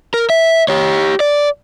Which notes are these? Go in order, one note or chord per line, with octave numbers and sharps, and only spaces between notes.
A#4
E5
G4 C#5
D5